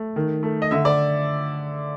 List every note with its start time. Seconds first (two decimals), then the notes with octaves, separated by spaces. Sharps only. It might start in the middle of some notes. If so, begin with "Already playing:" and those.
Already playing: A3
0.16 D#3
0.43 A3
0.62 D#5
0.71 D3 E5
0.85 D5